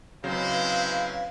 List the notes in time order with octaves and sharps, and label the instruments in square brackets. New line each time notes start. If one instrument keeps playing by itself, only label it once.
[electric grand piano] C#3 F#3 [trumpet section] G#3 E4 C5 [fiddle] C4 B4 [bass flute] F5